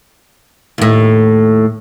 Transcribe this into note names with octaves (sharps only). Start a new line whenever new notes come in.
D#2 A2